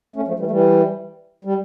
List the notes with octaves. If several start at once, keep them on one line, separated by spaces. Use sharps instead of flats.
A3 C#4
F3 A3
E3 G3
A3
E3 G3
G3